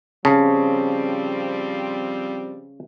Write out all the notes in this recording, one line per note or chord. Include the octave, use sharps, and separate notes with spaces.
C#3 F3 G3 C4 A5